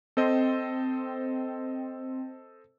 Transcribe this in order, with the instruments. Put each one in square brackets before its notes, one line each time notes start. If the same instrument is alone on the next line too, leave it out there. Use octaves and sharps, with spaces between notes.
[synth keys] C4 [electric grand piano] A4 C5 D#5